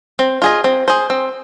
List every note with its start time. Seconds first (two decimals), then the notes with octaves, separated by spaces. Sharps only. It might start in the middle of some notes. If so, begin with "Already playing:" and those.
0.19 C4
0.42 F4 G#4 D#5
0.64 C4
0.88 G#4 C5
1.10 C4